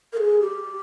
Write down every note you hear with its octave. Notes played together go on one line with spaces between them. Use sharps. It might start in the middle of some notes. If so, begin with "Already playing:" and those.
A#4
G#4
G4